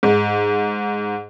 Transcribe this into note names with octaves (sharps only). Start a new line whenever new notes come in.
G#2